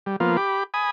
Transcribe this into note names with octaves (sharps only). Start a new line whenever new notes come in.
G3
F3 A#3 B3 F4
G4 B5 D6
G#5 B5 D#6